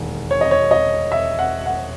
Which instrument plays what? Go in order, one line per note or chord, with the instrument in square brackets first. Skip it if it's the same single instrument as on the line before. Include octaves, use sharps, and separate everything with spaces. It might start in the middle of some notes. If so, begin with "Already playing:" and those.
Already playing: [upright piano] E1 D#2 D#3
C#5
D#5
C#5
D#5
E5
F#5
F#5